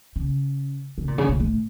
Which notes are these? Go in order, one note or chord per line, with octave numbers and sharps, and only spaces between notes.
C#3
C#3
A#2
C#3
A#2
A2